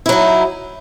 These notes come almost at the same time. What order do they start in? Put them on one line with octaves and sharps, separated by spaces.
E4 F#3 D#4